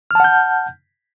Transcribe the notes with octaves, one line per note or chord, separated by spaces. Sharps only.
F#5 A5 F6 G6